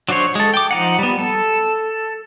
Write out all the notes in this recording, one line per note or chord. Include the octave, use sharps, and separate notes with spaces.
F#3 D4 F#4 C5 C#5
G#3 A4
G5 D6
F3 D#4 F#5
G3 B3
A4